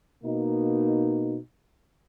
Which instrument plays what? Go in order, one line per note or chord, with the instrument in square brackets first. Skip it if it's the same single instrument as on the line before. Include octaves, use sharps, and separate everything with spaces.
[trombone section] B2 A#3 D#4